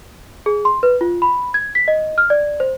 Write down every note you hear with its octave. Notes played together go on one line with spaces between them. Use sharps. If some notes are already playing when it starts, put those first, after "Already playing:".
G#4
C6
B4
F4
B5
G#6
B6
D#5
F6
D5
C5